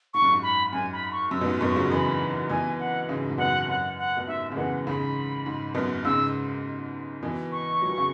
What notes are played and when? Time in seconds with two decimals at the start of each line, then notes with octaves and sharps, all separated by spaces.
0.14 G#2 C#6
0.22 F#2
0.32 G#2
0.43 B5
0.73 F#2 G#5
0.93 B5
1.12 C#6
1.31 F#2 E6
1.41 B2
1.46 G#2
1.61 F#2 B2 C#6
1.76 C#3 F#3
1.90 B2 E3 B5
2.50 B2 E3 G#5
2.79 F#5
3.09 G#2 C#3
3.29 G#2
3.38 F#2 B2 F#5
3.69 F#2 F#5
3.98 F#5
4.17 B2
4.27 G#2 E5
4.52 C#3
4.57 B2 E3 F#5
4.86 G#2 C#3 B5
5.46 G#2
5.74 F#2 B2
6.05 G#2 C#3 E6
7.23 B2 E3
7.52 C#6
7.82 F#3
7.89 E3
7.98 C#3